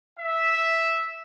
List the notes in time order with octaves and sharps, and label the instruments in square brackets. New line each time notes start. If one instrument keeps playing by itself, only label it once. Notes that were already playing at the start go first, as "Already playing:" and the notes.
[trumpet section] E5